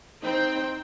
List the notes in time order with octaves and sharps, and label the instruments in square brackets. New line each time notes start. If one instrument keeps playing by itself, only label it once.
[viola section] C4 G5 [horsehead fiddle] D#4 C5